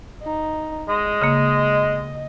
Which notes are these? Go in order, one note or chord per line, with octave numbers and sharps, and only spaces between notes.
D#4
G#3 D#5
C#3 A#3